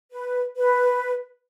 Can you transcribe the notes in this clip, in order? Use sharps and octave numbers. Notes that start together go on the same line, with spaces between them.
B4
B4